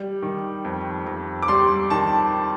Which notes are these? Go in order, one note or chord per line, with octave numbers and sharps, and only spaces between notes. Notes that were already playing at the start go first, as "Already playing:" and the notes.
Already playing: G3
D#3
F2
F2
D6
G3 C6
D#3 A5